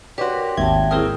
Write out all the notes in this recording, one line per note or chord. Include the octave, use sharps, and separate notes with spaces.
F#4 G4 B4 C#5 D5 C6
A#4
G#1 D#2 E5 G5 A5 G#6
F#3 C4 E4 G#4 A#4 D#6 F6